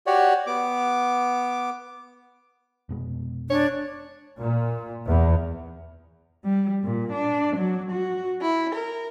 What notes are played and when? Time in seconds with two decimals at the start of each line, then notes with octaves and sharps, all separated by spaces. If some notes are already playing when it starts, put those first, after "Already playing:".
0.07 F#4 G4 C#5 D5
0.47 B3 D6
2.89 F1 B2 G#3
3.50 D4 C#5
4.40 A#2
5.08 E2
6.44 G3
6.84 A#2
7.13 D4
7.57 F#3
7.91 F#4
8.42 E4
8.75 A#4